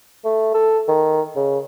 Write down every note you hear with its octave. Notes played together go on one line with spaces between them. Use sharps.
A3
A4
D#3
C#3